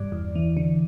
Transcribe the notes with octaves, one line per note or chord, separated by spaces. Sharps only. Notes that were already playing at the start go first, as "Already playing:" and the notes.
Already playing: G2 D5
E2
E3
D3